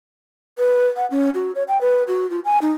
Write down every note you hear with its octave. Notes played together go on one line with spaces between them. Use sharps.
B4
F#5
C#4
F#4
C#5
G5
B4
F#4
F4
G#5
D#4